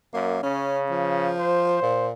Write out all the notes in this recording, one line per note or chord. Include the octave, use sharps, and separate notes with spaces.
F#2 A#3
C#3 C#4
F3
C5
A#2